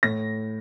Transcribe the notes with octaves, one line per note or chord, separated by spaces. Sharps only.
A2 A#6